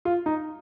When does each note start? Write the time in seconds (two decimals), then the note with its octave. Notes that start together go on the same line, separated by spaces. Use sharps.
0.05 F4
0.26 D#4